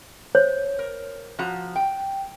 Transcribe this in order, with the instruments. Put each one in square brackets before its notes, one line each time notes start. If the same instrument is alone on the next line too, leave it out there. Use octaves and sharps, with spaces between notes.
[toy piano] C5 C#5
[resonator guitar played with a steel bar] A#4
F3 F#4 A#5
G5